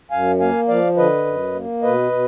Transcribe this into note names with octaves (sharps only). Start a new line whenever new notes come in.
F#2 F5 G#5
A#3 F5 G#5
F3 D5 F5
D3 B4 D#5
F#2
A#3
B2 B4 D#5
B2